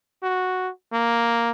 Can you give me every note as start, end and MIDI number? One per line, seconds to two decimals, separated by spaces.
0.23 0.69 66
0.93 1.51 58